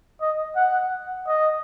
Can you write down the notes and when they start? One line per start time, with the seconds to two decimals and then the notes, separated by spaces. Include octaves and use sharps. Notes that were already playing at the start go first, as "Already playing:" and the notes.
0.21 D#5
0.56 F#5
1.27 D#5